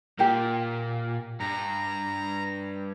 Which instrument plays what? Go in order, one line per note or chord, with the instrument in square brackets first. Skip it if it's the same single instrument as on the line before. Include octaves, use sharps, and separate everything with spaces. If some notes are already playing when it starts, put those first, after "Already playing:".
[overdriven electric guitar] A#2 [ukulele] G4 A#4
[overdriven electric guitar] G2 [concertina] A#5